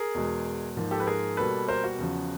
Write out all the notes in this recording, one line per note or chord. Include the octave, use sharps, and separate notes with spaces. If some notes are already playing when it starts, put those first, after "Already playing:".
Already playing: G#4 A#4
E2 B2 G#3
G#2 F3 A#3
G4 A4
B4
G#4 A#4
B2 G3 A#3 A4 B4
A#4 C5
F#4
E2 C#3 F3